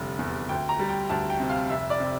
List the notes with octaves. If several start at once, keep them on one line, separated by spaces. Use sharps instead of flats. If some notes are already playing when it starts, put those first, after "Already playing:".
Already playing: F1 D3 G3
E2
D2 G5
A#5
G3
G5
D2 A5
G5
C3
F5
F1 E5
D5
C3